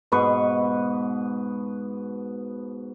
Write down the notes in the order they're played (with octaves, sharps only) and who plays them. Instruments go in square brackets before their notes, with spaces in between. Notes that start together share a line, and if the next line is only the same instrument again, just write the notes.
[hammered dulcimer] G#2 B2 B4 C#6